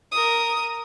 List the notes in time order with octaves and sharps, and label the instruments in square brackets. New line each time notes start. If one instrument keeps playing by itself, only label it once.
[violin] A#4 D#6